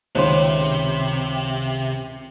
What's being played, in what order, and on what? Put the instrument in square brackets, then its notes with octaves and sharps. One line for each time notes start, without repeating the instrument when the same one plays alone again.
[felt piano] C#2 D#3 [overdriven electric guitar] C3 [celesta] C5 C#5 C6